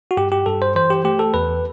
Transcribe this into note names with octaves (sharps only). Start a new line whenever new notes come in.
F#4
G2 G4
G4
G2 A4
C5
E3 C5
G4
A3 G4
A4
E2 B4